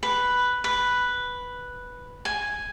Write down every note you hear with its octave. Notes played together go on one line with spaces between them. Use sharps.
B4
B4
G#5